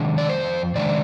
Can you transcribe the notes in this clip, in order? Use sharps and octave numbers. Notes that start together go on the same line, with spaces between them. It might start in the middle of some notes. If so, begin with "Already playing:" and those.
Already playing: C3 D#3 G#3 D4
D5
F2 C5
C3 D#3 G#3 D4 D5